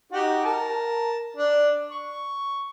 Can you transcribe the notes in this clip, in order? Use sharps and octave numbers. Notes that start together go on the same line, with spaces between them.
D#4 F#4 G4
A#4 A5
D4
C#6